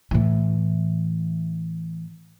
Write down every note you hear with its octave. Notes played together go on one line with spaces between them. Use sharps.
A2 E3